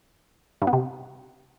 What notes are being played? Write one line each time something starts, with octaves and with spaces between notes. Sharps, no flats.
G2
B3
C3